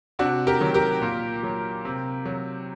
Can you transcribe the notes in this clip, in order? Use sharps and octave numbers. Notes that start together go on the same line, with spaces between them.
C3 D4 F#4
G4 A#4
D#3 F#3
G4 A#4
A#2
F#3
C3
F#3